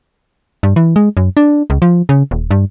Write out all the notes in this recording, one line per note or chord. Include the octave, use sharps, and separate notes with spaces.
G2
E3
G#3
F#2
D4
C#2
F3
C#3
D#1
G2